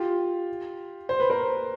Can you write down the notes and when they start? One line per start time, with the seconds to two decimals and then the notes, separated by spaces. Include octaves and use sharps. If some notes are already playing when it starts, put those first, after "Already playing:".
Already playing: F4 G4
1.09 C5
1.20 B4
1.30 A#4 C5